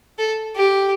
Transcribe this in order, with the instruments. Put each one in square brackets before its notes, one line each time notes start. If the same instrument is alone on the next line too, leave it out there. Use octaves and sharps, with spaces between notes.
[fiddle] A4
G4